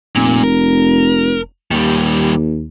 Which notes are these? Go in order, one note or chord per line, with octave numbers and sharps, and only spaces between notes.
F1 A#2
A#4
D#2 D#3 G3